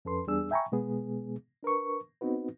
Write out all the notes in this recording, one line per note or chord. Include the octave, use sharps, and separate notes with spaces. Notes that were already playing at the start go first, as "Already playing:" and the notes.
F2 C#4 A4 B4 C6
E2 G3 B3 D4 G#4 E6
E5 G5 G#5 A#5 B5 C#6
B2 G#3 B3 G#4
D4 A#4 B4 C#6
B3 C4 D#4 F#4 B4